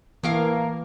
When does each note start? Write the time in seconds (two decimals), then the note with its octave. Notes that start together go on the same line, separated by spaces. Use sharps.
0.23 A2 E3 A#3 A#4 F5